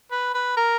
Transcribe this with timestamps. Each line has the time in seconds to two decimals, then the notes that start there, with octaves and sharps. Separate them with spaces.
0.12 B4
0.34 B4
0.57 A#4